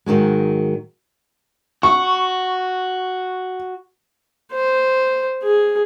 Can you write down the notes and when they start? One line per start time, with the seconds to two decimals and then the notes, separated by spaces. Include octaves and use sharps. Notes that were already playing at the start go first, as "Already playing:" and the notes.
0.06 G#2 D#3 F#3 G#3
1.83 F#4 C#6
4.53 C5
5.43 G#4